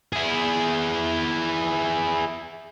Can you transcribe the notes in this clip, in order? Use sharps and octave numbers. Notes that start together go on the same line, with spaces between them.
E4 G#4